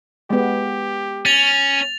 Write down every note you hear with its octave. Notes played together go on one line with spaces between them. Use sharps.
G#3 B3 G4
C#4 A6 F7